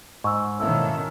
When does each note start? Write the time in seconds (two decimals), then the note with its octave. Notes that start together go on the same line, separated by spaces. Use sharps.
0.24 G#2 C#6 E6
0.60 B2 D#3 A#3 C#4 E4 A4 E6